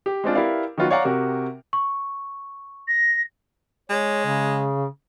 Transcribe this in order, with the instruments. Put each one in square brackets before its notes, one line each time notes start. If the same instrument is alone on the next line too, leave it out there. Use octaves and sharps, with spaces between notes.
[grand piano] G4
G#3 C4 D4 F4
E4 G4 A#4 B4 D5 F5
D#3 F#3 B3 F4 F#4
C#5 D5 F5 F#5 A#5
C3 F#4 G4 A#4
[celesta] C#6
[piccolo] A#6
[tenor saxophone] G#3 [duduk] C#5
[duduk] C#3